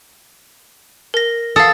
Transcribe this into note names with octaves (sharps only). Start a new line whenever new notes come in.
A#4 A#6
A4 F5 D#6